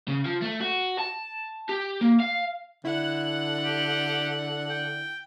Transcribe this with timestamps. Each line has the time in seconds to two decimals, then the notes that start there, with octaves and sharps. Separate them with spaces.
0.08 C#3
0.25 F3
0.42 A3
0.60 F#4
1.00 A5
1.69 G4
2.01 A#3
2.20 F5
2.85 D3 E4 F#5 F#6
3.64 G4
4.70 G5